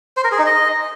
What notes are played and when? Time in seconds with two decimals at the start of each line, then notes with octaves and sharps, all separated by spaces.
0.17 C5
0.24 A#4
0.32 G#4
0.39 D#4
0.46 D#5